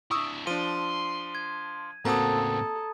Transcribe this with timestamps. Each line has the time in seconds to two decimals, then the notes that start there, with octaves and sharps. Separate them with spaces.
0.11 D4 E4 C#6 D#6 E6
0.47 F3 D4 C6 D#7
1.35 G#6
2.05 A2 C#3 A#3 C4 F#4 A4 A#5 D#6